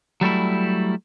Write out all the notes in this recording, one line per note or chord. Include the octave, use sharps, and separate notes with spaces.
F#3 G3 A3 E4